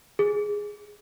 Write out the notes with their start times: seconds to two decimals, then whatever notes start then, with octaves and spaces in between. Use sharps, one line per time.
0.19 G#4